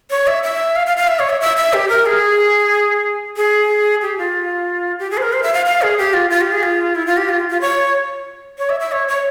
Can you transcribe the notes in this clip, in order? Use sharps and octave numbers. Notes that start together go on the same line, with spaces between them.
C#5
E5
E5
F5
F5
F5
E5
C#5
E5
E5
E5
G4
A#4
G#4
G#4
G4
F4
G4
G#4
C5
A#4
C5
E5
F5
F5
G#4
G4
F4
F4
G4
G#4
F4
E4
F4
G4
F4
F4
C#5
C#5
E5
E5
C#5
C#5